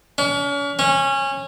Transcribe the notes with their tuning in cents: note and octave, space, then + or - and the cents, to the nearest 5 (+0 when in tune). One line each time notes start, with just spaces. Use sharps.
C#4 +40
C#4 -20